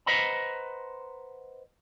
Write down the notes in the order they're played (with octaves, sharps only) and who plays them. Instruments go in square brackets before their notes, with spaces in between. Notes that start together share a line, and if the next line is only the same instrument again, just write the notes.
[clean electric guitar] B4 C5 D#5 F#5 A#5 B5